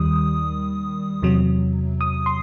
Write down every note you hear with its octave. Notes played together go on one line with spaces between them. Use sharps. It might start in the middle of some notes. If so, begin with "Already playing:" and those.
Already playing: D#2 D#3 G3 D#6
E2 C3 F#3
D#6
C6